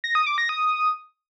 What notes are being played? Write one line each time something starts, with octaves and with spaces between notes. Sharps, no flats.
A#6
D#6
D6
A#6
D#6